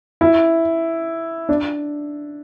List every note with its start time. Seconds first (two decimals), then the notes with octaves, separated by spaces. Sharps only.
0.21 E4
1.49 D4